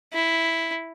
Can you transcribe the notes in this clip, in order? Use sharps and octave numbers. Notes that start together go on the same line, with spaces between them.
E4